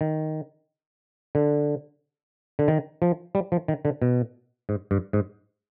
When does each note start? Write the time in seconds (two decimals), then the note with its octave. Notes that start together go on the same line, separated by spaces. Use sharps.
0.01 D#3
1.35 D3
2.59 D3
2.68 D#3
3.02 F3
3.35 G3
3.52 F3
3.68 D#3
3.85 D3
4.02 B2
4.69 G#2
4.91 G2
5.13 G#2